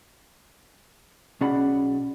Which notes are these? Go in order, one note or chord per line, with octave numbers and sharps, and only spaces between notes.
B1 C#4 G#4 D5 F#5 B5